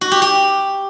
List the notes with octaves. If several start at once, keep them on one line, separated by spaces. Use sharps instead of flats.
F#4
G4
G4